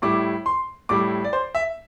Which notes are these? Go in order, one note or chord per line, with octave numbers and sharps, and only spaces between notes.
A2 G3 E4 D6
C6
A2 G3 E4 D6
D5
C5
E5